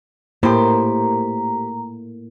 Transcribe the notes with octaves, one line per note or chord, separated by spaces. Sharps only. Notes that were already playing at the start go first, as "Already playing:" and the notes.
A2 A#3 G4 C5 A#5